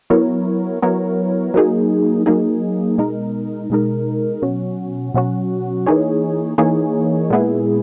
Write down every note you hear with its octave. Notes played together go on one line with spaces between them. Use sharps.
F#3 B3 E4 A#4 C#5
F#3 B3 E4 A#4 C#5
F#3 A#3 D#4 G#4
F#3 A#3 D#4 G#4
B2 G#3 D#4 A#4
B2 G#3 D#4 A#4
B2 F#3 C#4 F#4
B2 F#3 C#4 F#4
E3 A#3 D#4 G#4 C#5
E3 A#3 D#4 G#4 C#5
A#2 G#3 B3 E4 G#4